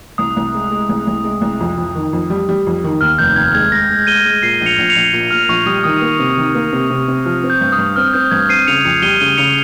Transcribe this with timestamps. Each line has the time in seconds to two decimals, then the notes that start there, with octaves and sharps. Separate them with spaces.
0.18 C2 D#6
0.37 C2
0.54 G#3
0.72 G#3
0.89 C2
1.07 C2
1.24 G#3
1.42 C2
1.60 F2
1.78 F2
1.95 D#3
2.13 F2
2.30 G3
2.49 G3
2.67 F2
2.84 D#3
3.01 D#2 F6
3.18 F1 G6
3.36 D#2 G#6
3.54 G#3 G#6
3.72 G#3 A#6
3.90 G#3
4.07 G#3 D#7 G7
4.25 G#3
4.42 A#2 C7 D#7
4.61 A#1
4.66 C#7 F7
4.78 A#1
4.89 C#7 F7
4.96 A#1
5.13 A#2
5.31 A#2 F6
5.49 A#1 C#6
5.66 G3 D#6
5.84 D#3 D#6
6.02 A#3
6.19 C3
6.37 D#3
6.55 A#3
6.72 C3
6.90 C3
7.08 C3
7.25 F3 F6
7.44 C4
7.50 G6
7.61 G2
7.72 D#6
7.78 G2
7.96 C4 F6
8.14 C4 G6
8.31 G2 G#6
8.49 C4 C7 D#7
8.67 C#3 C#7 F7
8.85 F2 C#7 F7
9.02 G3 D#7 G7
9.20 C#3 D#7 G7
9.37 C#3 C#7 F7